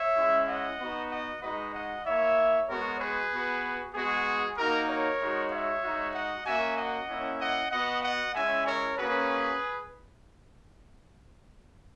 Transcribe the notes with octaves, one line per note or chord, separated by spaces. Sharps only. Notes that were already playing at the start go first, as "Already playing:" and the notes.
Already playing: C#5 E5
G#3 C#4 E4
D#5 F#5
B3 D#4 F#4
D#5 F#5
G#3 D#4 F#4 B4 D#5
D#5 F#5
A#3 E4 C#5 E5
G#3 B3 F#4 A#4 C#5
G#4 B4
B3 F#4
G#3 B3 F#4 G#4
A#3 D#4 F#4 A#4
A#4 C#5
G#3 D#4 F#4
C#5 E5
G#3 D#4 F#4
D#5 F#5
A#3 C#4 F#4 E5 G#5
D#5 F#5
A#3 C#4 E4
D#5 F#5
B3 F#4 D#5 F#5
D#5 F#5
G#3 C#4 E4 E5 G#5
A#4 C#5
A#3 C#4 F#4 G#4 B4